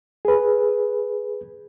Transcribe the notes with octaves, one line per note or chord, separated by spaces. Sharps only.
G#4 B4